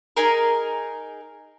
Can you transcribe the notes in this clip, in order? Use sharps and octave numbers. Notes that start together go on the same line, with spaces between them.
D#4 G#4 A#4